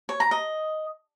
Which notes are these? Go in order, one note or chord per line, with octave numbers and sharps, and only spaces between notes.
C#5
A#5
D#5